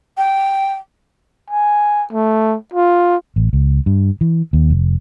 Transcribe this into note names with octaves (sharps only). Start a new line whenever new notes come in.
G5
G#5
A3
F4
A1
C#2
G2
E3
D#2
F1